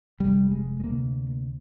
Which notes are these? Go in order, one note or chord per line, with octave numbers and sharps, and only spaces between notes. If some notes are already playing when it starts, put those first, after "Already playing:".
F1 F2 C3 G3
G#3
G#3
D2 C3 A#3